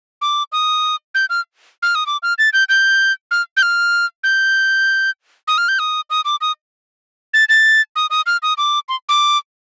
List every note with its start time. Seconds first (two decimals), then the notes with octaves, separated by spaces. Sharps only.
0.22 D6
0.52 D#6
1.15 G6
1.30 F6
1.83 F6
1.95 D#6
2.06 D6
2.23 F6
2.38 A6
2.53 G6
2.69 G6
3.31 F6
3.57 G6
3.62 F6
4.24 G6
5.48 D#6
5.58 F6
5.68 G6
5.79 D#6
6.10 D#6
6.25 D6
6.41 D#6
7.34 A6
7.49 A6
7.96 D#6
8.10 D#6
8.26 F6
8.43 D#6
8.58 D6
8.89 C6
9.09 D6